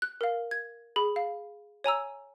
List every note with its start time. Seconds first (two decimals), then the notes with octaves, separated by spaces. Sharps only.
0.02 F#6
0.21 A#4 F5
0.51 G#6
0.96 G#4 B5
1.16 F5
1.84 C#5 G#5 A#5 E6